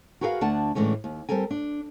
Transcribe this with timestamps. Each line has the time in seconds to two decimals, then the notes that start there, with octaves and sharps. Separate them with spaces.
0.21 F#4 G#4 A#4 B4 D#5 F5
0.41 D2 D4 F#5 A5
0.75 A2 D3 E3 G#3 C#4
1.04 D#2
1.29 G3 C4 A4 A#4 G#5
1.51 D4